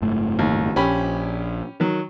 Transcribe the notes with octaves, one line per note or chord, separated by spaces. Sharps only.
F#1 G#2 A3
D#2
A#1 C#4 G4 B5
D#3 F#3